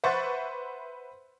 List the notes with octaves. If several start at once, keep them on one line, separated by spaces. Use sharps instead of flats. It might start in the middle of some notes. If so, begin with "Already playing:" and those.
B4 C5 E5 F#5 C#6 A6